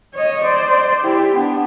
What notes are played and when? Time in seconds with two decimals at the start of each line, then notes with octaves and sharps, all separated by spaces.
0.14 C#5 D#5
0.44 C5 D5
1.03 E4 G4
1.34 B3 D4